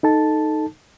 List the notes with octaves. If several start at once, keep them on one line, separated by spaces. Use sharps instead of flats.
D#4 A4 A5